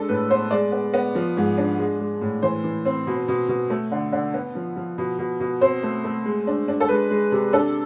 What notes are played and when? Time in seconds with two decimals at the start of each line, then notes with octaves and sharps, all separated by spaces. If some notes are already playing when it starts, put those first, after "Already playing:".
Already playing: G#3 D4 A4
0.09 A2 B4
0.30 B3 C5
0.51 G#3 D5
0.72 B3
0.93 B3
1.15 F3
1.37 G#2
1.58 D4
1.78 G#3
2.00 G#3
2.21 A2
2.42 E3 C5
2.64 E3
2.85 C4
3.07 B2
3.28 B2
3.49 B2
3.70 A3
3.91 D3
4.12 D3
4.34 B3
4.55 F3
4.76 F3
4.98 B2
5.19 B2
5.40 B2
5.61 C4 C5
5.83 A3
6.04 A3
6.25 G#3
6.47 D4
6.68 D4
6.80 A4
6.88 G#3 B4
7.10 G#3
7.32 C3
7.53 D4 A4